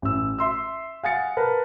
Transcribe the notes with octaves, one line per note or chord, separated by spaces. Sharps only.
A1 E6
E5 C6 E6
F5 F#5 G#5 D#6 A6 C#7
A#4 B4 A5